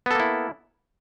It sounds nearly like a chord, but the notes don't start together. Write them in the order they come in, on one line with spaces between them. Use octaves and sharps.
B3 A4 A#3 E4